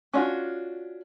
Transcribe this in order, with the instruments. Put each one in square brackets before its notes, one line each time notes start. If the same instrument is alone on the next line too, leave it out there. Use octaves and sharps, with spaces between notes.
[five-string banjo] C#4 D4 F4 F#4